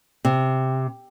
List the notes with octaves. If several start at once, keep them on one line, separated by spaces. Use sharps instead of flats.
C3